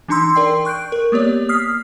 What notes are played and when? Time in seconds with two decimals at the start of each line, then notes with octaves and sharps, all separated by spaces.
0.08 E3 D4 D#4 A#5 C6 E6
0.35 A#4 D5 G5 C7
0.65 C#6 F#6 G6 D7
0.92 A#4
1.12 A#3 B3 G4 C#5 D5
1.49 D#6 F6 B6 C7